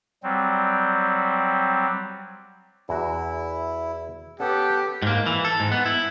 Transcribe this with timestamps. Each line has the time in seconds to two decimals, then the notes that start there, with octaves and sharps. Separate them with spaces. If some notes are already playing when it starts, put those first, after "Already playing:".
0.23 F#3 G3 C4
2.89 E2 E4 F#4
4.40 B3 C#4 G4 A4 F#5
5.02 G#2 A#3
5.26 E3
5.45 A4
5.60 G#2
5.72 B3
5.86 E4